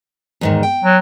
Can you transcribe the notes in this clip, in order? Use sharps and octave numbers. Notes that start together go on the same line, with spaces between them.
E2 G#2 D#3
G5
F#3